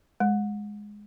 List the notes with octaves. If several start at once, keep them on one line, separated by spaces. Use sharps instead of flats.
G#3